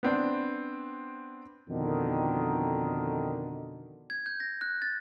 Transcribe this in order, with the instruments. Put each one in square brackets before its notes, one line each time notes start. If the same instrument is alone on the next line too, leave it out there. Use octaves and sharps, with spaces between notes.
[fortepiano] B3 C4 D4
[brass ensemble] F2 B2 D3 D#3
[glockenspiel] G#6
G6
A#6
F#6
A6